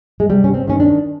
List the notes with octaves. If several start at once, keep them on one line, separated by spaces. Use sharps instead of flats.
G#3
C3 G3
C#4
C4
D#3 C#4
D4